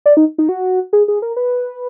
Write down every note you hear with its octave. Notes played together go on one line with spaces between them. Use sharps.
D5
D#4
D#4
F#4
G#4
G#4
A#4
B4